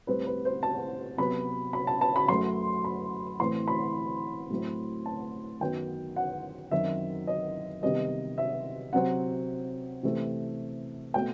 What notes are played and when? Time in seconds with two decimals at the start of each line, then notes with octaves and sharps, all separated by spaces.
0.07 A2 G3 C4 B4
0.27 B4
0.45 C5
0.63 A5
1.18 C3 F#3 B3 B5
1.73 B5
1.87 A5
2.01 A5
2.16 B5
2.28 F#2 F#3 A3 C6
2.84 B5
3.40 A2 E3 A3 C4 C6
3.68 B5
4.50 A2 F#3 A3 C4
5.06 A5
5.61 F#2 D#3 F#3 B3 G5
6.16 F#5
6.71 F#2 D#3 F#3 C4 E5
7.27 D#5
7.82 C3 D#3 G3 B3 D#5
8.38 E5
8.93 C3 F#3 C4 F#5
10.03 C3 E3 A3 C4
11.14 B2 A3 C4 G5